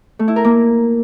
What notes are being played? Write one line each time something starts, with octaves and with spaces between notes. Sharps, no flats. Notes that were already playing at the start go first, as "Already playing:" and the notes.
A3
E4
A#4
A#3